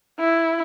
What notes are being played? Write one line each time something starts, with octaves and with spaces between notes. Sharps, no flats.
E4